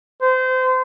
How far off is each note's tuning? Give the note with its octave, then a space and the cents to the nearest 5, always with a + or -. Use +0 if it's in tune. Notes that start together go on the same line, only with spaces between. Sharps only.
C5 -30